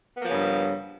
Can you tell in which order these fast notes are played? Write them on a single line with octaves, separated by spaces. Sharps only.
B3 A#3 F3 C#3 G2